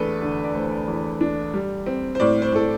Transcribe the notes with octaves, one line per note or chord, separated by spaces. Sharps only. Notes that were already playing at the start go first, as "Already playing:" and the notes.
Already playing: E2 A3 D4 A4 B4
D3
D5
A3 C5
E2
D4
G3
C4
C5
A2 D5
C5
A2 A4